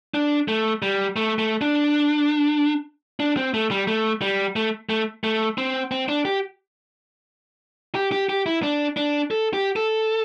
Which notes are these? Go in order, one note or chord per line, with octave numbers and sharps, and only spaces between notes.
D4
A3
G3
A3
A3
D4
D4
C4
A3
G3
A3
G3
A3
A3
A3
C4
C4
D4
G4
G4
G4
G4
E4
D4
D4
A4
G4
A4